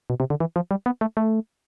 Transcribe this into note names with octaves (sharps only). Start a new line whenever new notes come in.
B2
C3
D3
E3
F3
G3
B3
A3
A3